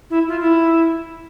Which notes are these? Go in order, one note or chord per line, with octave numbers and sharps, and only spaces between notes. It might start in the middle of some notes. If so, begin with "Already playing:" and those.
E4
F4
E4